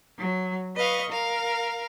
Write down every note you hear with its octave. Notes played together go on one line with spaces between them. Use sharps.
F#3
B4 D#5 F5 C#6
A#4 F5